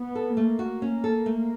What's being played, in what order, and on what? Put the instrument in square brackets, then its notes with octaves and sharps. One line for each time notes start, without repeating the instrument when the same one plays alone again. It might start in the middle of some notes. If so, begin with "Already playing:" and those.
Already playing: [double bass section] B3
[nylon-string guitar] A4
[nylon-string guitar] A3 [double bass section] A#3
[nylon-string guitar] F#4
C#4
A4
A3